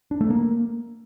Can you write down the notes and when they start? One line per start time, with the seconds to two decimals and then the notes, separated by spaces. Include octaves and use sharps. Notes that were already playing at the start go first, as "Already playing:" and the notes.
0.11 D4
0.21 A3
0.30 A#3